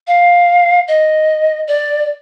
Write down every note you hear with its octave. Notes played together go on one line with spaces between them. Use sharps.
F5
D#5
D5